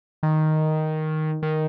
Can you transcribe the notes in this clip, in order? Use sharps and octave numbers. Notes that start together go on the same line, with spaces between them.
D#3
D#3